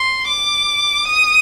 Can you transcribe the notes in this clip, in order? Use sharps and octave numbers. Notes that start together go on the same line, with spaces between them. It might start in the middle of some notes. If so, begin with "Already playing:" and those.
Already playing: C6
D6
D#6